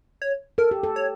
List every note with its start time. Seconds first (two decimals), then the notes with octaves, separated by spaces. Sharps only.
0.22 C#5
0.58 A4 A#4
0.71 G4
0.83 A4
0.96 C#5